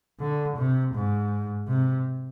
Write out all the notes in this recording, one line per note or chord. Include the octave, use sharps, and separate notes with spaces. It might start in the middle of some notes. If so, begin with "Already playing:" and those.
D3
C3
G#2
C3